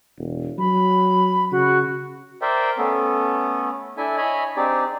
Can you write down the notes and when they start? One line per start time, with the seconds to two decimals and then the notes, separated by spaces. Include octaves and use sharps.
0.18 E1
0.59 F#3 B5
1.52 C#3 F#4
2.42 A#4 C5 D5 E5 G5
2.78 A3 B3 C#4 A4
3.97 D4 E4 A4 E5 G#5
4.17 C#5 D#5 E5 G#5 B5
4.56 C4 D4 D#4 G4 G#4 D5